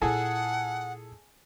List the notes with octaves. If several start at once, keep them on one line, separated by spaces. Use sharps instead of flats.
A#2 E4 G#4 A4 F#5 G#5